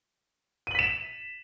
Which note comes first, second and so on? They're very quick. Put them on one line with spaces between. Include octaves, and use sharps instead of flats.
D#7 F#7 B6 E7